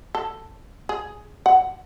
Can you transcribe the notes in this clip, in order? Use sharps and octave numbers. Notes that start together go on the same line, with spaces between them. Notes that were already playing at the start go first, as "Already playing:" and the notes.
A4
G#4
F#5